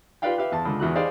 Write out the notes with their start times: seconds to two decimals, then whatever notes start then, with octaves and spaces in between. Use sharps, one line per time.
0.22 F4 G4 B4 D5 F5 G5
0.37 G4 B4 E5 F5
0.52 E2 A5
0.65 C#2 D3
0.80 E2 E3 F#4 F#6
0.95 D#4 G4 G#4 C5 D5 F5